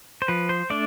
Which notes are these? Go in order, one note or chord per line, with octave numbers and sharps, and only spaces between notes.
C5
F3 B4
C5
A3 D4 D5